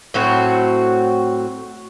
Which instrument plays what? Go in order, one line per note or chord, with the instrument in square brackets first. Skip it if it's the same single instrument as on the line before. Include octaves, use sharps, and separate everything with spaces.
[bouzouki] A2 F#3 C4 F#4